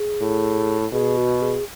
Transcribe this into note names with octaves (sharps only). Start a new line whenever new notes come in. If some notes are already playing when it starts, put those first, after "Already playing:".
Already playing: G#4
A2
B2 G#4
F#4
G#4